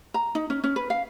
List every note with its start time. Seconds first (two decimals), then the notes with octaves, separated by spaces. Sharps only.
0.14 A#5
0.35 D#4
0.50 C#4
0.64 C#4
0.76 B4
0.90 F5